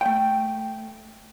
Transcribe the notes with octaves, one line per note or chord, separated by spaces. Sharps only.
A3 G5